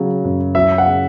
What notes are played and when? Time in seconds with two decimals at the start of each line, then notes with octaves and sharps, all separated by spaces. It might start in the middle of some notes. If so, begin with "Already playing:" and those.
Already playing: C#3 F#3
0.24 F#2
0.54 F#3 E5
0.78 F#5
0.86 C#3